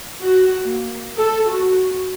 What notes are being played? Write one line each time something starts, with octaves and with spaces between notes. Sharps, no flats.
F#4
A#3
A4
F#4